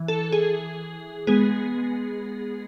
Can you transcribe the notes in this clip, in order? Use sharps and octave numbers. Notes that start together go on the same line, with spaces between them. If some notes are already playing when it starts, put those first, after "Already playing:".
Already playing: E3
A4
G#4
G#3 B3 G#4